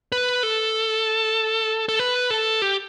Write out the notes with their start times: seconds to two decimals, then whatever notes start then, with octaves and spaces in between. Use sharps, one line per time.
0.12 B4
0.43 A4
1.89 A4
1.99 B4
2.30 A4
2.62 G4